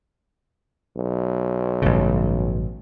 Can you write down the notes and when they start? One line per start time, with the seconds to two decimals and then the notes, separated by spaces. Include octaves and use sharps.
0.97 B1
1.82 A1 G2 C#3